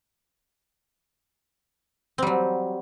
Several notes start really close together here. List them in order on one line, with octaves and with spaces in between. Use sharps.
C4 G3 F#3